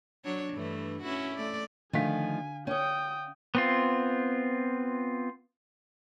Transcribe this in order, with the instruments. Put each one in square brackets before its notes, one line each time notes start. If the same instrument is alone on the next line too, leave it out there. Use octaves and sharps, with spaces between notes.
[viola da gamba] F#3 D4 C#5
G2 E3 A3
C#4 E4 F#4
A3 D5
[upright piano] D3 F5 B6 [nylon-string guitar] D#3 F3 A3 [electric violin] G#5
[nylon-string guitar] C#4 C#5 [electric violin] G5 D#6
[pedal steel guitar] B3 C4 F4